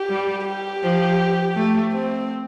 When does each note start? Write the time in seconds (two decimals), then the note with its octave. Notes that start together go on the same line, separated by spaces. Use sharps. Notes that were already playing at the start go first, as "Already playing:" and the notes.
Already playing: G4
0.10 G3
0.46 G4
0.83 F3
1.56 A3
1.93 C4